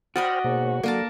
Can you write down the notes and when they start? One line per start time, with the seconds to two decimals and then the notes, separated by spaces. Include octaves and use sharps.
0.16 F#4 C5 D5 D#5 G5 B5 F6
0.44 G#2 B2 A#3 C#5
0.83 D3 F#3 A#3 A#4 A5